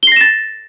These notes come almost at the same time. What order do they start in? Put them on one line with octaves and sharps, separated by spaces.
G7 C7 A#6 E7 A6